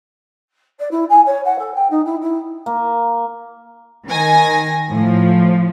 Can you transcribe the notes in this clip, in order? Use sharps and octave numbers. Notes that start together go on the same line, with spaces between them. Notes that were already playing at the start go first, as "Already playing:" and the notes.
D5
E4
G#5
C#5
F#5
A4
G5
D#4
E4
E4
A#3
D#3 G#5 A#6
A2 F3